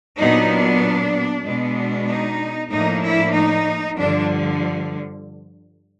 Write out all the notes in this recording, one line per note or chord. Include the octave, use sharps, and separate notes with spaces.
A#2 F#3 B3 D4 D#4
D4
B2 G#3 B3 D4
D#4
A2 F3 A#3 D4 D#4
E4
D#4
G2 D3 F3 D4